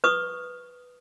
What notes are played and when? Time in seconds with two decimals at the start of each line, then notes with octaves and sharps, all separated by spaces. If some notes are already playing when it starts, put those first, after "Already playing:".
0.04 B4 C#6 D#6